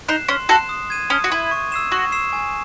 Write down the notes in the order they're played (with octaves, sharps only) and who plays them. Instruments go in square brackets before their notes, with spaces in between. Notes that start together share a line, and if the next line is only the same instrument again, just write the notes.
[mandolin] D#4 [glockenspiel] F#6 C7 E7
[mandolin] C#4 [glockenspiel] C6
[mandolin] F#4 A4 [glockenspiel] F#6 C7 E7
[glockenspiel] D#6
G#6 D#7
[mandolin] C#4 [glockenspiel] D#6
[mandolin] F#4
[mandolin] E4 [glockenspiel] G#6 D#7
[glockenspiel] C#6
E6 C7 E7
[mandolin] F#4 [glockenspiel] C#6
[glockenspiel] E6 C7 E7
G#5